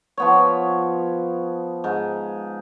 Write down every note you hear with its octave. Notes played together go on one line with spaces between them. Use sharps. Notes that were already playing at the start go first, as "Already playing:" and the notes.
F3 B3 C#5
G#2